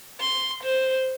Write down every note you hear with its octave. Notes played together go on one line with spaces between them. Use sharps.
C6
C5